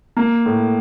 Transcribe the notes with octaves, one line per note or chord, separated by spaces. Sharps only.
A#3
A2